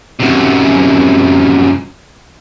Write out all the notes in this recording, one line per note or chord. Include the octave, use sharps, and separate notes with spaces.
F#2 C3